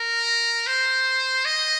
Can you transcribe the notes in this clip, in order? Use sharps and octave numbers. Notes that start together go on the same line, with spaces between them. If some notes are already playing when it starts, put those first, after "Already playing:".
Already playing: A#4
C5
D#5